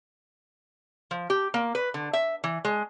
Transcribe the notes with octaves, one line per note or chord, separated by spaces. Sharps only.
F3
G4
A#3
B4
D3
E5
E3
G#3